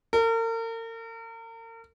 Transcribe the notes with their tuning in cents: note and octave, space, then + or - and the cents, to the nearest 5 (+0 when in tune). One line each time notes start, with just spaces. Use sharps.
A#4 -40